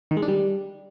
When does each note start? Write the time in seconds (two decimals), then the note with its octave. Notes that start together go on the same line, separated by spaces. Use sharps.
0.11 D#3
0.17 G#3
0.22 D4
0.28 G3